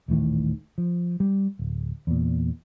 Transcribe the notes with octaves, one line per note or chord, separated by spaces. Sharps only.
D#1 A1 A2 D#3
F3
G3
D1
E2 A#2